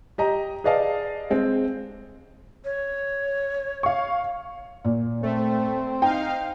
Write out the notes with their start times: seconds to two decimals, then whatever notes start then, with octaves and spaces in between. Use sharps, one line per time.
0.18 G4 D#5 A#5
0.64 G#4 B4 D5 D#5 F5 A5
1.30 G#3 C4
2.65 C#5
3.83 F5 C#6
4.85 A#2
5.23 A3 C4
6.02 D#4 F5 G5